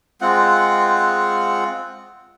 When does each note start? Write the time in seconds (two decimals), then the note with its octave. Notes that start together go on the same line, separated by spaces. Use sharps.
0.21 G#3 C4 F4 F#5